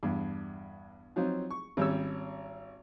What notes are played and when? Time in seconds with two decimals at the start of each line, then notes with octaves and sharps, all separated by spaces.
0.03 E2 G2
1.16 F3 F#3 C4 D#4 F4
1.51 C#6
1.77 G#1 G3 C#4 C#5 E6